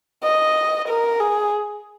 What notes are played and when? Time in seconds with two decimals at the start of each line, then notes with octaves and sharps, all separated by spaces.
0.24 D#5
0.88 A#4
1.20 G#4